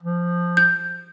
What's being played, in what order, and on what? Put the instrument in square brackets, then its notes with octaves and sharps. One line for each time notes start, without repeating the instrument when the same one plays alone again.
[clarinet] F3
[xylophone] G6